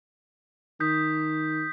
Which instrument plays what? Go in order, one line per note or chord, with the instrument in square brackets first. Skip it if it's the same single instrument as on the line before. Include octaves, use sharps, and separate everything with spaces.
[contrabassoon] D#3 [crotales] D#6 G6 B6